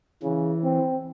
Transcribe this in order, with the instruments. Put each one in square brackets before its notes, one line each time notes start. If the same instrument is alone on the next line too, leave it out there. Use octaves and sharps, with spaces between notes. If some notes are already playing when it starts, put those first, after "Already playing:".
[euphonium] C#3 [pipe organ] E3
[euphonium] C4